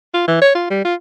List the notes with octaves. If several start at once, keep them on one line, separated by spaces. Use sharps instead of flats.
F4
E3
C#5
F4
G3
F4